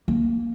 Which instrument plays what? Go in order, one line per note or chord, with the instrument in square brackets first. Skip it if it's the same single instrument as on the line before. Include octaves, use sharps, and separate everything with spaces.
[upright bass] A#3